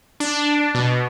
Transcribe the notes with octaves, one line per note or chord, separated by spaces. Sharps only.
D4
B2